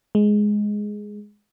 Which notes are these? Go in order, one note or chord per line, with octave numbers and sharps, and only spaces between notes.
G#3